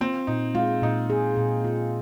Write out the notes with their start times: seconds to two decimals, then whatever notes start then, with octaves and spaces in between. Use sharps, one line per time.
0.01 C4 F4
0.27 A#2 D#4
0.55 G#3 F4
0.82 A#2 D#4
1.10 G#4
1.37 A#2
1.65 F4